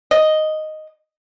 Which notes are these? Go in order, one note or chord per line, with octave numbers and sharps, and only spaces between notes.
D#5